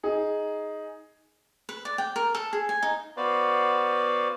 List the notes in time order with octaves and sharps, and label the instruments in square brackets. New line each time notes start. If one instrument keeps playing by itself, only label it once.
[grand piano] D#4 G#4
[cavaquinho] B4
D5
G5
A#4
A4
G#4
G#5
D#4
[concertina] B3 F#4 B4 C5 D5 F5